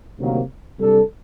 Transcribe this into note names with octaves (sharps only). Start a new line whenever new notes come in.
D2 C3 D#3 F#3 A#3
C3 G3 D4 A4